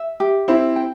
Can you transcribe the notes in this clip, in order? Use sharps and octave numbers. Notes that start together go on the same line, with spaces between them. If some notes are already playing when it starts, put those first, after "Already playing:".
Already playing: E5
G4
C4 E4 C5
G5